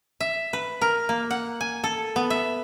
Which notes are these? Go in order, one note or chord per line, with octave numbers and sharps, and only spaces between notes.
E5
B4
A#4
A#3
F#5
G#5
A4
B3
E5